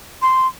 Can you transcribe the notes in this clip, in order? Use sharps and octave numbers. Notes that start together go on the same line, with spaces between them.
C6